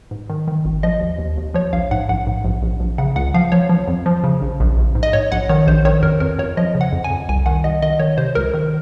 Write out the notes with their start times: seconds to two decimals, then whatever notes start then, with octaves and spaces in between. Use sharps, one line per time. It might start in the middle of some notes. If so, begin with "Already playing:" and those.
0.11 G#2
0.30 D#3
0.48 D#3
0.65 G#1
0.83 F3 D#5
1.01 D#2
1.19 D#2
1.37 D#2
1.54 F3 C#5
1.73 A#1 F5
1.91 G#2 F#5
2.09 A#1 F#5
2.27 G#2
2.45 A#1
2.62 A#1
2.80 A#1
2.98 C#3 F#5
3.16 C#2 F#5
3.34 F3 F5
3.52 F3 C#5
3.69 F3
3.88 F2
4.06 F3
4.24 C#3
4.41 A#1
4.60 A#1
4.77 A#1
4.95 G#2
5.03 D#5
5.13 G#2 C#5
5.32 A#1 F#5
5.49 D#3 C#5
5.67 A#1 C5
5.85 D#3 C#5
6.03 F2 A#4
6.20 F2 A#4
6.39 F2 C#5
6.57 F3 D#5
6.75 C#3
6.81 F#5
6.93 F2
7.04 G#5
7.10 F2
7.29 C2 G#5
7.46 D#3 F#5
7.64 C2 D#5
7.82 D#3 D#5
8.00 D#3 C#5
8.18 C3 C5
8.35 C#2 A#4
8.54 D#3 A#4